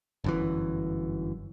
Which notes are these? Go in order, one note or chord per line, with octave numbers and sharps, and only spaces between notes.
G1 F#2 E3